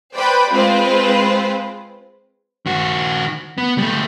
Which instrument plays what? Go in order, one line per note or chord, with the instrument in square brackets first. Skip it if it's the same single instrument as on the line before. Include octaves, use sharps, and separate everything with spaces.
[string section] B4 C5 D5 G5 B5
G#3 C4 F4 B4 C5
[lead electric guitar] D#3 F#4
B3
G3 A3